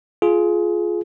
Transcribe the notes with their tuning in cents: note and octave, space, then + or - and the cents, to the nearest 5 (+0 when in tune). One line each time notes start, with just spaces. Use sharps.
F4 +0 G#4 +20